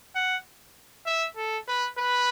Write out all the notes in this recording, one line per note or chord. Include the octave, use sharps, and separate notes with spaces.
F#5
E5
A4
B4
B4